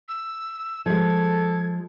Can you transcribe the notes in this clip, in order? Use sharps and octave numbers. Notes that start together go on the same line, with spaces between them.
E6
F3 G#3 A4 G#6